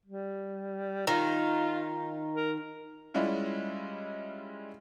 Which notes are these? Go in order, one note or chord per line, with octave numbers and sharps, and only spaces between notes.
G3
D#3 F4
A#4
G3 G#3 C#4 E4 F4